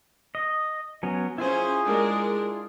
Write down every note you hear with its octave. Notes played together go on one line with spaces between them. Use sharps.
D#5
F#3 B3 C#4
C#4 E4 F4 G#4 C5
G#3 D4 A#4